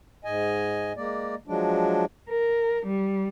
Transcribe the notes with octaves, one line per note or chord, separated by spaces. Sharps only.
G#2 D#5 G#5
G#3 A#3 D5
F3 F#3 G#3 D4
A#4
G3